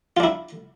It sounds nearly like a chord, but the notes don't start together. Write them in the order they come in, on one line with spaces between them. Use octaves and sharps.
F4 D4 E4